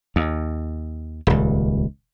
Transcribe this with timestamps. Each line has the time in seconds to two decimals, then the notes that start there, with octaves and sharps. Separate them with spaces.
0.16 D#2
1.27 D#1 C#2